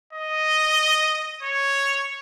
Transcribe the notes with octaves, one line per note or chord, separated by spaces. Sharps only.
D#5
C#5